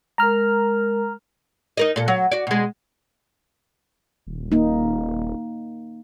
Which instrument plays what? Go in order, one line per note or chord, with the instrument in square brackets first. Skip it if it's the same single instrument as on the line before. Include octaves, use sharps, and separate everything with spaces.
[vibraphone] G#3 A#4 [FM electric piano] A#5 F6
[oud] D#4 A#4 D#5
A#2 A4
F#3
F#4 D5
B2 G#3
[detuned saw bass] D#1
[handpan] A#3 D#4